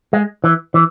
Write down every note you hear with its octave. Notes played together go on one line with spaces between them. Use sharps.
G#3
E3
E3